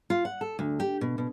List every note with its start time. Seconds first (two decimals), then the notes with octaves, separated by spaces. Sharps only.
0.10 F4
0.25 F#5
0.41 A4
0.59 D2
0.80 G4
1.01 B2
1.18 B2